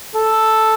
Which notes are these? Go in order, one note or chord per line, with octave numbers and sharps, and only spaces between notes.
A4